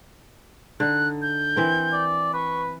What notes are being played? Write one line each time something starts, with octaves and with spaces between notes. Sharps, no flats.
D3 D#4 F#6
G6
E3 C4 A#4
D5
B4 C#6